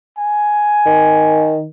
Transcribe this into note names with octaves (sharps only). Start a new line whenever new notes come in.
G#5
D#3